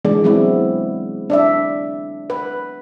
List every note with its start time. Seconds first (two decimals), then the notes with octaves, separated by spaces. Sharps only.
0.05 E3 G#3 B3 D4 D5
0.24 F#3 G#3 B3 C4 E4
1.30 D4 D5 E5
2.30 B4